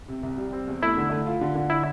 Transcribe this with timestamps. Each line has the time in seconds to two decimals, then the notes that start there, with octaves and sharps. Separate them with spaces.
0.08 C3
0.23 C2
0.38 G3
0.53 C4
0.67 E2
0.82 A3 E4
0.97 D3
1.11 A3
1.26 F4
1.41 D3
1.55 D3
1.70 E4